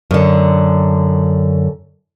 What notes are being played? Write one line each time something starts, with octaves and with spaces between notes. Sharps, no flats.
F#2 D3